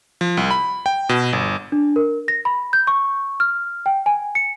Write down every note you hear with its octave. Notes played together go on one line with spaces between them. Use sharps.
F3
C2
B5
G5
B2
G1
D4
A#4
A#6
B5
G6
C#6
F6
G5
G#5
C#7